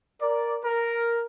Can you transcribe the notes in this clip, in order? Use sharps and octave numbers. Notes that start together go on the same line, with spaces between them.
A#4 D5
A#4